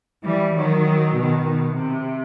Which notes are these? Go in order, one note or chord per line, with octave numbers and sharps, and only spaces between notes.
E3 G3
D#3 F#3
B2 D#3
B2
C3